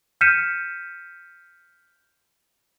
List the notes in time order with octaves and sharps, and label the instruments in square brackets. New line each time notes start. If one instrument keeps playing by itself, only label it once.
[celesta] F6 G6 B6 C#7 D#7 E7